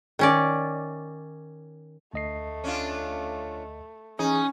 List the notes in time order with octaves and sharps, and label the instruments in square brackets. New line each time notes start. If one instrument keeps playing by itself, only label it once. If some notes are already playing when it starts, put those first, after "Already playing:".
[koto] D#3 C#4 D5
[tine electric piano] D2 D#5 C7 [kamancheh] A3
[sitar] C#4 D4 F4
[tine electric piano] E3 G#4 C#5 [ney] C#4 [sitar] D#4